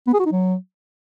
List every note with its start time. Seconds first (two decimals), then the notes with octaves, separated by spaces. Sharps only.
0.07 B3
0.13 G#4
0.19 F#4
0.26 D#4
0.32 F#3